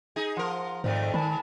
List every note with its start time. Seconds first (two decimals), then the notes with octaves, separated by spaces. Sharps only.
0.16 D#4 G#4
0.37 F3 A#4 F#5 C6
0.84 F2 G#2 D#3 A3 C5 D5
1.14 G#2 D#3 G#5 A5 B5